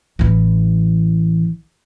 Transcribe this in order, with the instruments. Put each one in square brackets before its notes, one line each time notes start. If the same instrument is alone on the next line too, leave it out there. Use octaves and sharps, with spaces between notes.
[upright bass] A1 E3